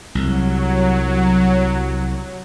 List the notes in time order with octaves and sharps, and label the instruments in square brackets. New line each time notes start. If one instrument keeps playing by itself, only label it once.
[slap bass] C2 [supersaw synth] F#3